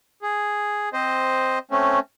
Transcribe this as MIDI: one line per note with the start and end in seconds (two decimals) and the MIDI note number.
0.22 0.89 68
0.93 1.59 60
0.93 1.59 72
0.93 1.59 75
1.71 1.99 57
1.71 1.99 60
1.71 1.99 61